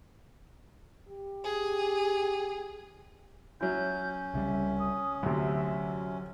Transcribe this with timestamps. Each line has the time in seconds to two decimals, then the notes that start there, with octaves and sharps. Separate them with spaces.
1.08 G4
1.44 G#4
3.61 F#3 C#4 E4 G6
4.34 C2 C#3 G3 E5
4.79 D#6
5.23 D2 C3 F#3 E5